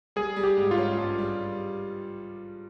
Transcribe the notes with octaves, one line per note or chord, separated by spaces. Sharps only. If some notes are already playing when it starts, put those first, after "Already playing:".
G3 G#4
G3
G4
G#2
F4
C#4
G2
G3